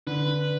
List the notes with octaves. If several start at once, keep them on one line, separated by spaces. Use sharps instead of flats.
D3 B4